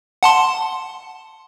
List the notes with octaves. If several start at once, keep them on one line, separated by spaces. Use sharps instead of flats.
F#5 A5 C6